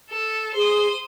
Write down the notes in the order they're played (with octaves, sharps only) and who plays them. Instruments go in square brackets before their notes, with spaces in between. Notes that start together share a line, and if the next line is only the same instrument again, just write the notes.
[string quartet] A4
[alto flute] G#4 [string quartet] C5 D#6